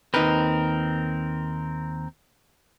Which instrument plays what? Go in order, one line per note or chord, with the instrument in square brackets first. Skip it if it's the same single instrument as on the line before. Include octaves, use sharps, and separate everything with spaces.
[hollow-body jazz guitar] D#2 D#4 B4 [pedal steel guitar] C4 A#4